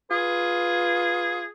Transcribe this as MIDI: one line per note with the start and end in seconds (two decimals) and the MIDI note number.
0.11 1.46 65
0.11 1.51 68
0.11 1.42 71